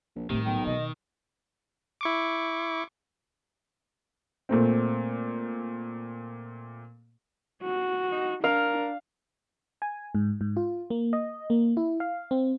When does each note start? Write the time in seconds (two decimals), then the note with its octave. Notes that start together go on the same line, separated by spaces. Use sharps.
0.16 A#1
0.30 A2 C3 D#3 G3
0.46 B1 G5
0.66 B2 D#5
2.01 E4 C#6 D6
4.49 A#2 A3 C4
7.63 F#4
8.12 D#4
8.44 D4 A#4 F5
9.82 G#5
10.15 G#2
10.41 G#2
10.57 F4
10.90 A#3
11.13 D#5
11.50 A#3
11.77 E4
12.00 F5
12.31 C4